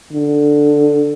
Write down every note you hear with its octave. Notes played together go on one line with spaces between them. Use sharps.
D3